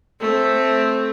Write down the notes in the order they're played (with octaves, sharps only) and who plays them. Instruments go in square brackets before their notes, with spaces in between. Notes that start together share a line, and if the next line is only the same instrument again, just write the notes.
[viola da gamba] A3 C4